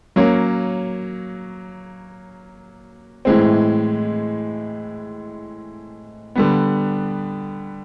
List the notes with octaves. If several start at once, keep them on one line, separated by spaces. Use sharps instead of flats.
F#3 A#3 C#4
A2 E3 G#3 C4
D3 G3 B3